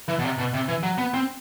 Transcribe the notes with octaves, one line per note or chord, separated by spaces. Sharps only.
E3
B2
C3
B2
C3
E3
F#3
B3
C4